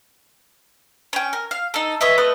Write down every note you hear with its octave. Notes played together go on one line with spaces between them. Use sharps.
C#4 G5
A#4
F5
D#4 A4
B4 C#5 D#5 E5
A3 B4 D#5